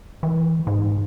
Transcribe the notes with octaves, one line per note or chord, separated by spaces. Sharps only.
E3
G#2